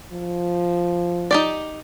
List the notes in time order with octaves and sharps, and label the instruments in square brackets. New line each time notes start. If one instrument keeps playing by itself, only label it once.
[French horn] F3
[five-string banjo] D#4 G4 D5